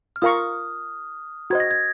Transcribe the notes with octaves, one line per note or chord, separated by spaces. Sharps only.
F6
F4 A#4 F5 A#5 C#6 D#6
F#4 C5 D#5 G#6
A#6
G#6